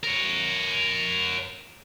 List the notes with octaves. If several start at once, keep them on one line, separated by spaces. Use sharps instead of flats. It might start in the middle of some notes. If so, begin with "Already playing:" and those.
A#4 C#5